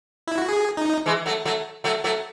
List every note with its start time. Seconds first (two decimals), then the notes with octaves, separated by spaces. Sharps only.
0.28 E4
0.38 F#4
0.48 G#4
0.77 D#4
1.06 E3 G#3
1.26 F#3 A3
1.45 F#3 A3
1.84 F#3 A3
2.04 F#3 A3